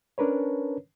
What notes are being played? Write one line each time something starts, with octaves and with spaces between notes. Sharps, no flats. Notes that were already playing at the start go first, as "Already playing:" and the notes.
C#4 D4 A#4 B4 C#5